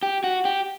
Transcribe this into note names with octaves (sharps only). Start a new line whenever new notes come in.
G4
F#4
G4